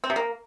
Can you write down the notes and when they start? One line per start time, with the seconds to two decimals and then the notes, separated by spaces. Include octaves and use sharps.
0.04 C4
0.10 C3
0.16 A#3